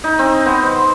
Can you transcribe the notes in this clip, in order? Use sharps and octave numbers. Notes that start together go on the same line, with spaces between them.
D#4
C4
B3
C5